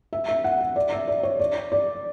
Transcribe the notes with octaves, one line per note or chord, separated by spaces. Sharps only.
E5
E5
F#5
E5
D5
E5
D5
C#5
D5
D5